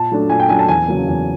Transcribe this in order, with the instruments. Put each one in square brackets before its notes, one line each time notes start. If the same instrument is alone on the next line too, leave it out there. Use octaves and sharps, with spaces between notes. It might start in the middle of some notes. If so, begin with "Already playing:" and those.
Already playing: [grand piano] A#2 A5
F#3 A3 D4
A#2 G#5
G5
F#3 A3 D4 G#5
A5
E2 G#5
C#3 F#3 A#3
E2